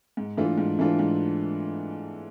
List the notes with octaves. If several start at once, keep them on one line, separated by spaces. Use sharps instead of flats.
G#2
E3 A3 D4 F4
G#2
E3 A3 D4 F4
G#2